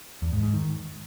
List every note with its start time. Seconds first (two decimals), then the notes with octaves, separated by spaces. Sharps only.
0.22 E2
0.33 G#2
0.43 G#2
0.54 D#3